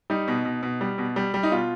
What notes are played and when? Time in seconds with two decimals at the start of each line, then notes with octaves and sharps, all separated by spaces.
0.10 G3 D#4
0.28 B2
0.45 B2
0.63 B2
0.81 G3
0.98 B2
1.16 G3
1.34 G3
1.43 D#4
1.51 B2 F4